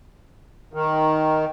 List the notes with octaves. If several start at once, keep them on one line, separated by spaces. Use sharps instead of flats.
D#3